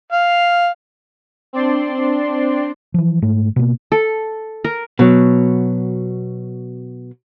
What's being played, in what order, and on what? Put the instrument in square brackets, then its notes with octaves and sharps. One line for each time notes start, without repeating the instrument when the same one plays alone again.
[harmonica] F5
[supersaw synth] C4 D4 D5 C6
[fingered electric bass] E3 F3
G#2 A3
B2 A#3
[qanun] A4
A#4
[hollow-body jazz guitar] B2 F#3